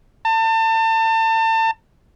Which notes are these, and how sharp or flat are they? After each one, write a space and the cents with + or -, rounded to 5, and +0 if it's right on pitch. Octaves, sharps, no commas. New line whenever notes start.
A5 +30